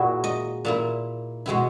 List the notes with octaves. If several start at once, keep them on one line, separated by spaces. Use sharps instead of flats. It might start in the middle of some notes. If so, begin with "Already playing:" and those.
Already playing: A#2 A#3 E4 F#4 G#4
D#5
A#2 A#3 E4
B2 G#3 B3 E4